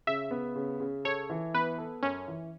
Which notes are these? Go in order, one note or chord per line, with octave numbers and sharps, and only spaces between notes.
C#3 E5
B3
C#3
C#3
A4 C#5
E3
B3 B4
A4
F#2 C#4
E3